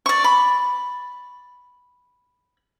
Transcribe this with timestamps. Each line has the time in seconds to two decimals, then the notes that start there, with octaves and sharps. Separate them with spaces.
0.06 D5 C#6
0.24 B5